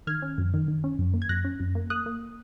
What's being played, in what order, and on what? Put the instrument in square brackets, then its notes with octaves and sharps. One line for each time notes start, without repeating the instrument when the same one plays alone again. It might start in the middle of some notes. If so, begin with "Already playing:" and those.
[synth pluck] D#3 F6 G#6
C#4
F#2
D#3
D#3
C#4
F#2
A#3
G#6
F#2 F#6 A#6
C#4
F#2
A#3
A#3 D#6 F#6
A#3